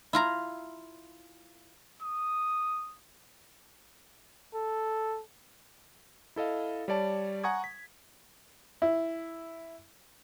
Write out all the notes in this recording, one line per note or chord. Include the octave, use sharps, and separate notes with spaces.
E4 F4 A#5
D#6
A4
E4 A4 D#5 F5
G3 C#5 D5 A5
F#5 G#5 A#5 C#6 D#6 G#6
B6
E4